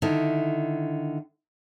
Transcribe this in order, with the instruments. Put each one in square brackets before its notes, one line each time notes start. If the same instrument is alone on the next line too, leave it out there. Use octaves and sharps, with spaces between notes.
[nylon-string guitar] D3 D#3 E4